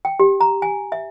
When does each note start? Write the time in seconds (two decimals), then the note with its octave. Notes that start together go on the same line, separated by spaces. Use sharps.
0.05 G5
0.20 G4
0.41 A#5
0.62 G#5
0.92 E5